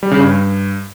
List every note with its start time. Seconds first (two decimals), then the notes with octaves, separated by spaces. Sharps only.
0.03 G3
0.11 C#3
0.20 G2